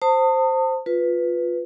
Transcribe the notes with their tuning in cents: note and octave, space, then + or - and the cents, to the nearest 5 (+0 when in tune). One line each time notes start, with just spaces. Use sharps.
C5 +0 A5 +35 D#6 -5
F4 +15 B4 +0